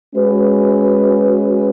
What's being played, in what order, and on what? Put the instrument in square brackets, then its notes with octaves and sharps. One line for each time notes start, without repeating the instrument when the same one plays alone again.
[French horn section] G#3 C#4 F#4 B4